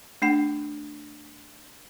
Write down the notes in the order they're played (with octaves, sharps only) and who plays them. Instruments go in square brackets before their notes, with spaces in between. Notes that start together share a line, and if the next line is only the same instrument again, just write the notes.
[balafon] A3 D4 F#5